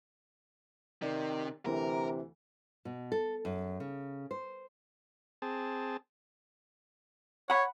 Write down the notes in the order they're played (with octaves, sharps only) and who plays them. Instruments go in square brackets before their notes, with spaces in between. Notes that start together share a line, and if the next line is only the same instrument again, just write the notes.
[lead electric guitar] C3 [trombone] D#3 [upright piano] D5
[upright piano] D2 E3 [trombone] C3 [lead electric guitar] A#4
[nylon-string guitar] B2
A4
F#2
C#3
C5
[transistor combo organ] C4 G#4 A5
[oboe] C#5 [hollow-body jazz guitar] F#5 B5